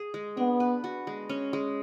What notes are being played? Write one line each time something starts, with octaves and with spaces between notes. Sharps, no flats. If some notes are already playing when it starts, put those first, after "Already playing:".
Already playing: G#4
G#3
B3 D4
B4
F#4
G#3
C#4
G#3